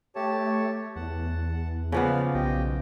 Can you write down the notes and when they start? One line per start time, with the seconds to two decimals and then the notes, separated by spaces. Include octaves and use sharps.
0.15 A3 G4 C#5 A5
0.96 E2 F#5 A5
1.92 C#3 F3 B3 D5 F6
2.34 B1 G4 D#5 G5